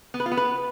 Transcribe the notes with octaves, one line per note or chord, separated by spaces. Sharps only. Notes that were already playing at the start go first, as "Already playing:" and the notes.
B3
B4
F4
B3
B4